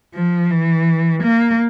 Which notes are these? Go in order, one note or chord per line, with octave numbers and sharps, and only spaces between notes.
F3
E3
A#3